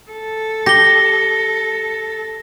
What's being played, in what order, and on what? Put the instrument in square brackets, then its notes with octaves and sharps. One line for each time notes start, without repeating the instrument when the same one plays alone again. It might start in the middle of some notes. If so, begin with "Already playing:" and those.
[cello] A4
[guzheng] G4 [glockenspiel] A#6 G7